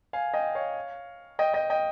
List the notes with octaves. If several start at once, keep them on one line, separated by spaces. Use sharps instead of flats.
F5 G#5
D#5 G5
C#5 F5
D#5 G5
D#5 G5
D#5 G5